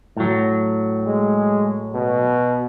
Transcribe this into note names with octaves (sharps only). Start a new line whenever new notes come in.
A2 F#3
G#3
B2